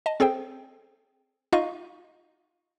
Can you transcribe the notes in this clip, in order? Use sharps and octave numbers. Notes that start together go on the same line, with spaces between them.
D#5 A5
C4 G#4 A4 C5 G5
D#4 F4 D#5 F5 C#6 D#7